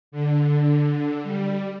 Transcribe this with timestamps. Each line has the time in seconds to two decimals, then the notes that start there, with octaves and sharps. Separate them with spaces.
0.12 D3
1.24 G3